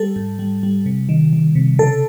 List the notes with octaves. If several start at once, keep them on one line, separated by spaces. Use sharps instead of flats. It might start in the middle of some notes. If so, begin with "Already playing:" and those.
Already playing: G3 A4
G#2
G3
G3
C3
D#3
D#3
C3
C#3 A4